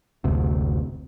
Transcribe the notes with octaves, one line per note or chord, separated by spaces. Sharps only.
F#1 D2 C3